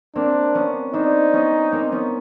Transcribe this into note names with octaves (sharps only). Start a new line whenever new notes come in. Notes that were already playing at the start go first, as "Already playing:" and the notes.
A#3 C4 D4
B3 C#4
C4 D4 D#4
B3 C#4
A#3 C4
B3 C#4